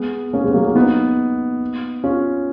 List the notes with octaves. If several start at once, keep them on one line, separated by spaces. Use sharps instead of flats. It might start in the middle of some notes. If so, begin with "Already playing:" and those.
Already playing: G#3 B3
A#3 C#4
G#3 B3
F#3 A#3
A#3 C#4
B3 D#4
C#4 F4